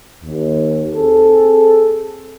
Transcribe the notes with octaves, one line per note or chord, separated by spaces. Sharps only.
D#2
C4 G#4 A4